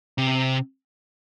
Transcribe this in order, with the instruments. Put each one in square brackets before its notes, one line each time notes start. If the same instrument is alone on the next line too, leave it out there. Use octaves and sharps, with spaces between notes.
[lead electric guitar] C3